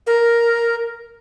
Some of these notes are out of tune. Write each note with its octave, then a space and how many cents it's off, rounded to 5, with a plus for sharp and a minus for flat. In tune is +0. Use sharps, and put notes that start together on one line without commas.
A#4 +5